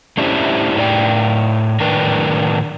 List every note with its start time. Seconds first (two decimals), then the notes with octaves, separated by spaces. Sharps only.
0.17 A3 C#4 D4 E4 G4 C5
0.77 A2 D5 G5
1.80 A2 D#3 D4 A#4 B4 G5